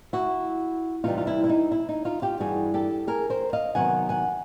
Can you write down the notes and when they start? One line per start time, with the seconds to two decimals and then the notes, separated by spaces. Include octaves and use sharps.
0.13 E4 F#4
1.04 C3 E3 G3 D#4 F4
1.18 F4
1.27 E4
1.44 E4
1.49 D#4
1.72 E4
1.89 D#4
2.05 D#4 F4
2.22 F4 G4
2.40 G2 E3 G3 F#4 G#4
2.74 G4 A4
3.07 G#4 A#4
3.30 A#4 C5
3.53 D#5 F5
3.75 C3 D#3 F#3 B3 F#5 G#5
4.09 F#5 G#5